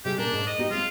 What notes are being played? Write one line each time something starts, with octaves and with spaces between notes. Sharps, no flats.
C3 G3 G4 G#4
A#2 D4 G#4 A#4
G#2
D#5
B3 D#4 G4
G#3 C4 F4